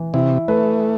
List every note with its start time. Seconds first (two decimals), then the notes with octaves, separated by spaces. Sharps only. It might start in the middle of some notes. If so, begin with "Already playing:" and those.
Already playing: E3
0.14 C3 E4
0.48 A3 B4